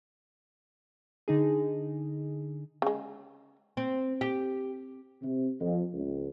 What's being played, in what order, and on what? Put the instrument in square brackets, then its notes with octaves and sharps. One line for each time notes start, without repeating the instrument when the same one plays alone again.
[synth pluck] D3 D#4 G#4
[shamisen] C#3 G#3
[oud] C4
G4
[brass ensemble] C3
F2
C#2